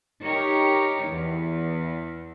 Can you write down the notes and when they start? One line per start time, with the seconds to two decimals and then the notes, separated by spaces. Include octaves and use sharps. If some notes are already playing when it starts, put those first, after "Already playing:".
0.23 D#4 G4 A#4 C#5
1.07 E2